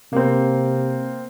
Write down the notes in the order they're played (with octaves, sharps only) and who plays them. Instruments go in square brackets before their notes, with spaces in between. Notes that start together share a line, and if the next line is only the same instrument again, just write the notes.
[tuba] C3 [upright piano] A#3 C4